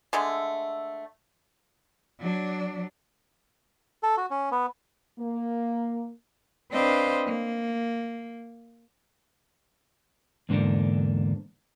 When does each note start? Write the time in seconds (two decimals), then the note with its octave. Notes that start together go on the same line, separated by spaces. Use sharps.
0.13 D3 G#3 A3
2.20 F#3 D4
4.03 A4
4.17 F#4
4.31 C#4
4.52 B3
5.19 A#3
6.71 C4 D4 B4 C5 D#5 F5
7.26 A#3
10.49 E2 G#2 D3 A#3 D4